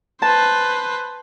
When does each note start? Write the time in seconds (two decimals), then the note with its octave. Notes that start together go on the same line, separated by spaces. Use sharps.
0.22 B4 C5 A5